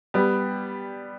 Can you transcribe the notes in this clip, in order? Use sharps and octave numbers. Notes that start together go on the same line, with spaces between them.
G3 B3